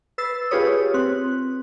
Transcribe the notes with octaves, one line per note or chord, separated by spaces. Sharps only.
B4 E6 A6 C7
F4 G4 G#4 B4 C#5 D#6
C4 F#6